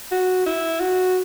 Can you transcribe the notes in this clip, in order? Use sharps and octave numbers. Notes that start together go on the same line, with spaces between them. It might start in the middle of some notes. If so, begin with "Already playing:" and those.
F#4
E4
F#4